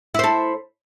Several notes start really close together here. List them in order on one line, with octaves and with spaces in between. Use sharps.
E4 C5 A4